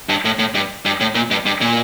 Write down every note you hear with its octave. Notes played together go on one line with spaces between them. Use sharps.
G2
A2
A2
G2
G2
A2
A#2
G2
G2
A#2